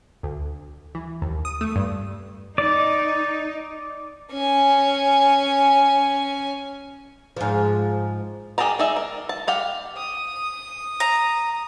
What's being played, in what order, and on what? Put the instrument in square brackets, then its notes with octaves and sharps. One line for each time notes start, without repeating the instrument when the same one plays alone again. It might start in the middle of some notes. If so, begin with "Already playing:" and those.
[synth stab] D2
E3
D#2
D#6
A3
G2
[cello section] D#4 [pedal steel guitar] D5
[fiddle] C#4 G#5
[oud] G#2 F3
[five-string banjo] G4 G#4 A#4 A5 A#5
D#4 G#4 D5 E5
A#4
A5
G4 F5 F#5
[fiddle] D#6
[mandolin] A#5